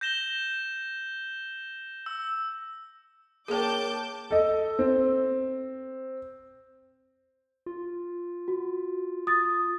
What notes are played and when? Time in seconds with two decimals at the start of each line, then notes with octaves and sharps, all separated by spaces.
0.01 G6 A#6 E7 G7
2.06 E6
3.48 A#3 G#4 A#4 C#5 G5 A5 D6 G6
4.31 A4 D#5
4.79 C4
7.66 F4
8.48 F#4
9.27 D#6 A6